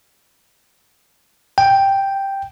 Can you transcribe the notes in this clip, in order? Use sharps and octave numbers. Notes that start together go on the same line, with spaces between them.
G5